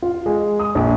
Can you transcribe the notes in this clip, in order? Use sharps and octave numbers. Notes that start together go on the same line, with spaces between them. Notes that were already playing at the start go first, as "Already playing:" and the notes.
F4
G#3
D#6
A#1